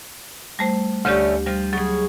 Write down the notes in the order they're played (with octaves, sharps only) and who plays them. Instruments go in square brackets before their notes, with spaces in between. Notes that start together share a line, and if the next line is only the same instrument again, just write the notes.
[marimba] G3 A3 C5
[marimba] D2 G4 [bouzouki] D3 A3 C#4
[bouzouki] F3 [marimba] G3
[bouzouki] C#3 G#4 [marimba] F#3